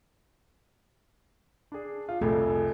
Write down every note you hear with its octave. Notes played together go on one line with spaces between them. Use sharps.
D4 G#4
F4
C2 F2 A3 G#4 A4